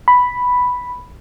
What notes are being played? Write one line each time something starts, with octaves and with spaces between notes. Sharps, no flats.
B5